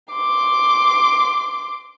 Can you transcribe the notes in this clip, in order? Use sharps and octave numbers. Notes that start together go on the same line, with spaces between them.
C6 D6